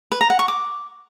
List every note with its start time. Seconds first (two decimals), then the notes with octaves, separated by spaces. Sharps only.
0.12 B4
0.21 A#5
0.30 F#5
0.39 C#6
0.48 D6